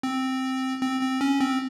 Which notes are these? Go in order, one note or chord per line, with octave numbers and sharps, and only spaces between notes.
C4
C4
C4
C#4
C4